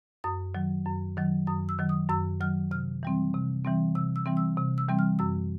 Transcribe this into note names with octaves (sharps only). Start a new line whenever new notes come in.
F#2 D#6
D#3 F#3
F#2
D#3 F#3
F#2 D#6
E6
D#3 F#3
D#6
F#2 E6
D#3 F#3 F6
C3 F6
E3 G3 C4
C3
E3 G3 C4
C3 E6
E6
E3 G3 C4
E6
C3
E6
E3 G3 C4
F6
F#2 E6